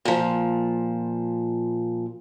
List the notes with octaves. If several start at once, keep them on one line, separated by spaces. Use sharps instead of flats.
A#2 F3